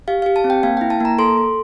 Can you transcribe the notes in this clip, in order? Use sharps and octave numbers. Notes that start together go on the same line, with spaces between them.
G4 F5
G4 F5
A5
C4
G5
A#3 F5
E4 G5
A5
A#3 A#5
A4 C6
A4